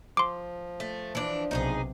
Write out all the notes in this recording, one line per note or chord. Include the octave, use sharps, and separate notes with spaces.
F3 C6 D6
A3
E3 D4
B1 C3 D#4 F#4 G#4